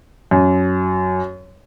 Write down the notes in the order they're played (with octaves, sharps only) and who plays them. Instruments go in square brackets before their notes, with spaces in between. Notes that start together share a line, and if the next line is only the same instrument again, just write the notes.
[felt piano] F#2